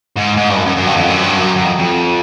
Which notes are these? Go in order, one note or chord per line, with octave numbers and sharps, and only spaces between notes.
G#2
G#2
G2
F#2
F#2
F#2
G2
F2
F#2
G2
F#2
F#2
F2
F2